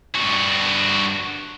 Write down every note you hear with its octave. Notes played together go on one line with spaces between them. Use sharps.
G2 F#4